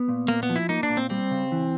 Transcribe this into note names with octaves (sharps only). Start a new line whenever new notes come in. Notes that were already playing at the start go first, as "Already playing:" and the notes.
Already playing: B3
A#2
A#2 A#3
B3
F3
E4
A#3 D#4
D4
A#2
C4
G3 C4
C#3
E3